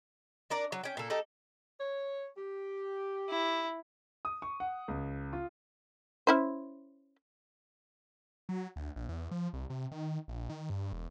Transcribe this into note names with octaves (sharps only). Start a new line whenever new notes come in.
D4 A#4 D5
F#3
C#4 G5
A#2 A4
A3 D#4 G4 A4
C#5
G4
E4
D#6
C#6
F#5
C#2
F4
C#4 E4 C5
F#3
D2
A#1
E2
F3
C2
C3
D#3
A#1
D#3
G2
E1